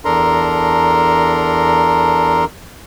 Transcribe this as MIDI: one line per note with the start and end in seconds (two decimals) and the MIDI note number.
0.05 2.45 40
0.05 2.45 62
0.05 2.45 69
0.05 2.45 70
0.05 2.45 82
0.05 2.45 84